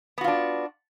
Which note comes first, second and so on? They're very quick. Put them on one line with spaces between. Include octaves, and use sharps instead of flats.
B3 F#4 F4 D4